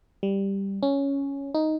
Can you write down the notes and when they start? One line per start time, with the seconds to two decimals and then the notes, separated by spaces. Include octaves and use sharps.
0.23 G3
0.83 C#4
1.55 D#4